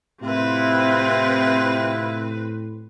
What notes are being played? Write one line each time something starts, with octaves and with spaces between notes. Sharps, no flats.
A2 C3 C4 E4 F4 B4